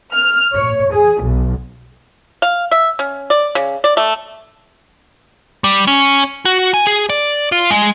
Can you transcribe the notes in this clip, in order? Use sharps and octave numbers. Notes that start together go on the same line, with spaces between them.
F6
C#5
G#4
B1
F5
E5
C#4
D5
C#3
D5
A3
G3
C#4
F#4
G#5
G#4
D5
F4
G#3